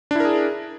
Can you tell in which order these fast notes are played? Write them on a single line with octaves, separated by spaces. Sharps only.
D4 E4 A#4 G#4